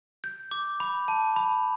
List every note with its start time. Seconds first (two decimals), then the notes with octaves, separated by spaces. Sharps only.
0.24 G6
0.51 D6
0.80 B5
1.08 A5
1.36 B5